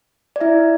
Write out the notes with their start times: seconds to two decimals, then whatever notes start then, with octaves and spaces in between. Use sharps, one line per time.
0.36 D5
0.41 E4 E5